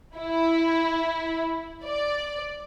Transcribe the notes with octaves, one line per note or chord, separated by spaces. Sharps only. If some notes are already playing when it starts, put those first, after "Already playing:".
E4
D5